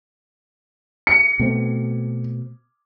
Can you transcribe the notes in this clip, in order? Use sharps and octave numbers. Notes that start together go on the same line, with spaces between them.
C#7
B2 A3 C4